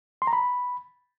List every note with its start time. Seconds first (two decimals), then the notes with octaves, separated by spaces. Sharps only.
0.22 C6
0.27 A#5
0.33 B5